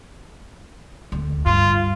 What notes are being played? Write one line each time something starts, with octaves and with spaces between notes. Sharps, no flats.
D2
G2 F4